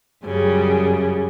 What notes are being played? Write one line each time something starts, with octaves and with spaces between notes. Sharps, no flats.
F#2 C#3 G3